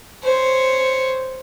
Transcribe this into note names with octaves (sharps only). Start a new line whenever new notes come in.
C5 C#5